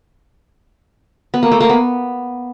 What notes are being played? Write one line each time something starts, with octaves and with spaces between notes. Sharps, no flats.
B3
A#3
A3
A#3
B3